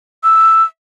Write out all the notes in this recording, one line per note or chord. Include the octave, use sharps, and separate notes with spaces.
E6